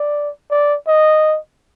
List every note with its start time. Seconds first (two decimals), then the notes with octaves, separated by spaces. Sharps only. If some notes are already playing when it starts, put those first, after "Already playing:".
Already playing: D5
0.51 D5
0.88 D#5